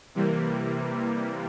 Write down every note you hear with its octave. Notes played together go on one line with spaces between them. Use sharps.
C3 E3 G3 A#3